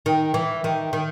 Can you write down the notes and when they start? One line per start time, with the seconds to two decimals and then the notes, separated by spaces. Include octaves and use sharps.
0.06 D#3
0.34 E3
0.64 D#3
0.93 D#3